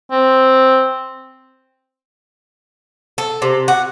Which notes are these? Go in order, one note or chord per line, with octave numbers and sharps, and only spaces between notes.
C4
A4
C3
F#4